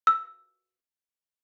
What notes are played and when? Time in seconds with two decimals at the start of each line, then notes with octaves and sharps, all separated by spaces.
0.07 E6